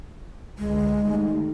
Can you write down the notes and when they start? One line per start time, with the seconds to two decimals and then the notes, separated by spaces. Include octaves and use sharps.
0.58 C#2 D3 G#3
1.04 D#3 G3 A3